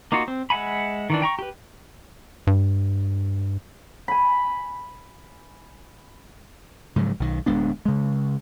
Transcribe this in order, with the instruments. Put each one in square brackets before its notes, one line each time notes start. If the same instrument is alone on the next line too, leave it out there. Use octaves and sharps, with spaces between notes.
[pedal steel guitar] A#3 D#4 F4 F#4
C4
G#3 E5 F#5 G#5 B5
D#3 E3 D4
G5 A#5 C#6
G4 B4
[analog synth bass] G2
[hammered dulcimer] G#5 B5
[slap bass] G#2 C#3 F3 F#3
B1 D#3
D1 G#3 B3 D4
C#3 G#3